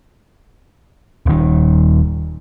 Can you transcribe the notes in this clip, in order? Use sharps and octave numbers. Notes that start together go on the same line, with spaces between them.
D#1 D#3